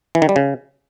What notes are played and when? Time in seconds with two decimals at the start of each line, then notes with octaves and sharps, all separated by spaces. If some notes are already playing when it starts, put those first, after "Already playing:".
0.15 E3
0.22 D#3
0.29 G3
0.36 C#3